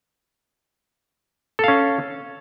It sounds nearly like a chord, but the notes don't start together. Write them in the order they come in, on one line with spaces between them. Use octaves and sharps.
A4 F5 C#4